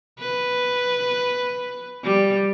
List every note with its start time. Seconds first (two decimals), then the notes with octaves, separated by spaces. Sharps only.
0.20 B4
2.04 G3